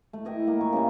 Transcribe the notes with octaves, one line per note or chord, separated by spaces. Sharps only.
A3
E4 D#5 E5 G5
A#3
A#2 C#6
C#3 G3 A#3